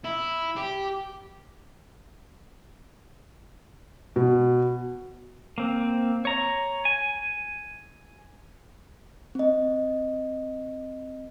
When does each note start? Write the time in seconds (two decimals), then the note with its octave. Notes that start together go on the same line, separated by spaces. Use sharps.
0.04 E4
0.56 G4
4.16 B2
5.58 A#3 C4
6.25 C#5 A#5
6.85 G#5
9.35 C4 D#5